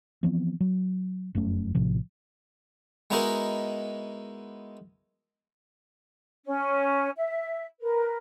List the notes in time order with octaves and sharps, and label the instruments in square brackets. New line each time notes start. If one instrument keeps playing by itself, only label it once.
[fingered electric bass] E3 F3 B3 C4
F#3
F1 F#2 A3 C#4
A#1 A2 C3 F3
[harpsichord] G#3 B3 D#4 E4 F#4 A#4
[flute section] C#4
E5
A#4 B4